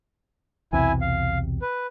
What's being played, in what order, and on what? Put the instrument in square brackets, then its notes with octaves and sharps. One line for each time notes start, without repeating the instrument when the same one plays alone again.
[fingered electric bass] B1 E2 C3 [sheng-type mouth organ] E4 G#5
[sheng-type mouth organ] F5
B4